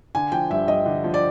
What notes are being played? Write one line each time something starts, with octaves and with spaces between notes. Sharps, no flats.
D3 G#5
F3 G5
G2 E5
G2 D#5
D3
F3
D5